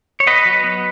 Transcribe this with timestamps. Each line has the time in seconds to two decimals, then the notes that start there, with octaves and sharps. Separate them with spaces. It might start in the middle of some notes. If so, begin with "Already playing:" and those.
0.20 C#5
0.27 B3 B4 D#5
0.45 F#3
0.64 B3